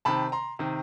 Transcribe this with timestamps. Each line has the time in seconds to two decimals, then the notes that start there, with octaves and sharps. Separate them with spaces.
0.05 C3 D#3 A5 B5
0.32 A#5 C6
0.59 C3 D#3